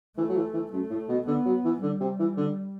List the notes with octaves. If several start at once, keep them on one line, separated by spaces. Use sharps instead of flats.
E3 A3
F#3
E3
E3
F#2 A3
A2
B2
D3 B3
F#3
E3
D3 G3
C3
E3
D3